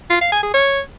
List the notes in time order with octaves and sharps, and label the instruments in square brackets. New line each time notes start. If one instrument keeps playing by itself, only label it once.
[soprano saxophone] F4
F5
G#5
G#4
C#5